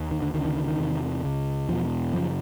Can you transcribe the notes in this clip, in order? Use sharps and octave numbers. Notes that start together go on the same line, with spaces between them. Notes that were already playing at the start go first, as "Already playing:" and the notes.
Already playing: D#2
D#3
D3
D2 C#3 D#3
D#3
D#3
D#3
E2 C3
C#2 C#3
E2 B2 F3
F#2 C#3 F3